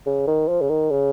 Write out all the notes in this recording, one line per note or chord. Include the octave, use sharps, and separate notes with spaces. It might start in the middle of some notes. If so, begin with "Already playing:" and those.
C#3
D#3
F3
C#3
D#3
C#3